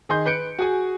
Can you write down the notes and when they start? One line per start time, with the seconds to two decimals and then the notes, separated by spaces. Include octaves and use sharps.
0.09 D#3 G#4 D#5 C6 G6
0.26 B4 G6 C#7 D7
0.59 F#4 G#4 G#5